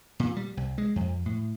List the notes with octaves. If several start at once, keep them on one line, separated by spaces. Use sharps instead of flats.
A#2
G3
C2
G#3
F2
A2